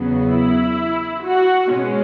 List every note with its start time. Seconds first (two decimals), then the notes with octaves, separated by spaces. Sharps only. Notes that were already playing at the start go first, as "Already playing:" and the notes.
Already playing: E2 C#3 F#3 B3
0.31 E4
1.24 F#4
1.69 B2 G#3 C#4